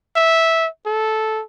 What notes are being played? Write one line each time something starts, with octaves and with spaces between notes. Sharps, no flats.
E5
A4